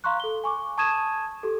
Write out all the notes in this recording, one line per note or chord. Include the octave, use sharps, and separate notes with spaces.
F5 A#5 C6 C#6 F#6
A4 G7
G#5 C#6 D6
A5 C#6 D#6 G#6 D#7 E7
G4 A4